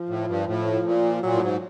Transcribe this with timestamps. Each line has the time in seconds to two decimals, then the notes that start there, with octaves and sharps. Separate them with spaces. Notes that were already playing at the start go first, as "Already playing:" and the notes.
Already playing: F3
0.09 A2
0.28 G2
0.47 A2
0.85 A#2
1.23 A#2 F#3
1.34 A2
1.41 G#2